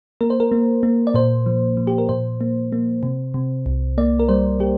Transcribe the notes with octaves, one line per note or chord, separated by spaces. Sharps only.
A#3 A#4
C5
A#4
A#3
A#3
D5
A#2 C5
F3
F3
G4
A#4
A#2 C5
A#3
A#3
C3
C3
C2
A#3 D5
A#4
G3 C5
G3 G4